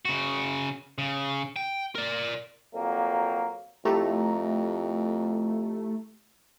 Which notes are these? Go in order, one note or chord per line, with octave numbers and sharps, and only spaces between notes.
C#3 F#4
C#3
G5
A#4 D5
F2 F#3 A#3
F2 A3 E4 G4 A#5